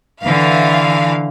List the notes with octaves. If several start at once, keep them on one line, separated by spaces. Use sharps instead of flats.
D3 E3 F5